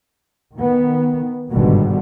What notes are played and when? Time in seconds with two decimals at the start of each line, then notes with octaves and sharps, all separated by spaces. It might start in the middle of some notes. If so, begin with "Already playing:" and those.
0.59 D#3 B3
1.52 G1 G#2 B2 D3 D#3 G3